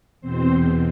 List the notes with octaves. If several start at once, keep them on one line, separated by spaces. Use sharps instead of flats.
E2 B2 C4 C5